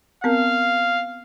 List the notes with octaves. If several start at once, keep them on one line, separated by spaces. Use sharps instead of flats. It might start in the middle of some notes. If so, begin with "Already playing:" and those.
B3 C4 A#4 F5